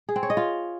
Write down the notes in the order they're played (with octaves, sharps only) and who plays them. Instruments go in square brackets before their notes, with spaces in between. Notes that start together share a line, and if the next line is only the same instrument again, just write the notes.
[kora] G#4
C4
C#5
D#5
F4